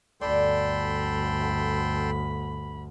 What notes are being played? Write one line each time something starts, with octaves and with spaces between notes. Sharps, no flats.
G1 D2 A4 D5 G5 B5 C6